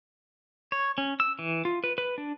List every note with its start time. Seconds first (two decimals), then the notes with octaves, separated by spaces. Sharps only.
0.72 C#5
0.98 C#4
1.20 E6
1.39 E3
1.65 F4
1.84 B4
1.98 B4
2.18 D4